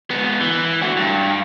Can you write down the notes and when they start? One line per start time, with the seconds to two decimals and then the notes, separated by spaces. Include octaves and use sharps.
0.11 G#2 B3
0.40 E3
0.82 A3 F#4
0.97 G2